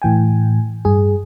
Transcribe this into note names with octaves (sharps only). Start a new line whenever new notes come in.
A2 E3 G5 G#5
G2 G#4